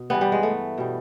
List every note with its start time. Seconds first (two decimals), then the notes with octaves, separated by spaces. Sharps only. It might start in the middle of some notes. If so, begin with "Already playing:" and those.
Already playing: B2
0.10 G2 E3 G3 B3
0.21 G3
0.32 G#3
0.43 A3
0.78 B2 G3